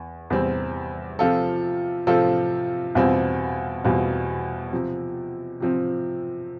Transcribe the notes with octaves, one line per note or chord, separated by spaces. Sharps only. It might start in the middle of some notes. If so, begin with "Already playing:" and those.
Already playing: E2
E2 C3 G3 C4
C3 F3 C4 F4 A4
C3 F3 C4 F4 A4
E2 B2 G3 C4 F4
E2 B2 G3 C4 F4
C3 F3 C4
C3 F3 C4